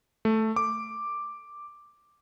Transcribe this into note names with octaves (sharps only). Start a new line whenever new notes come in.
A3
D6